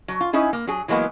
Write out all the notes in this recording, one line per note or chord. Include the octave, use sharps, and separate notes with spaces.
F#3
F4
C#4 D#4 E4 G#4
A#3
F#3 G#4
E3 F#3 G#3 A#3 B3